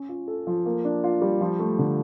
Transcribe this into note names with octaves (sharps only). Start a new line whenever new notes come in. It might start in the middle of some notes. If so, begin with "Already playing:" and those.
Already playing: C#4
F4
A4
F3
A#3
D4
F4
G3
F3
A3
D3